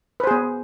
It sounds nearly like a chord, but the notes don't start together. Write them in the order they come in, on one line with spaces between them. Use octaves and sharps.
B4 C5 G#4 B3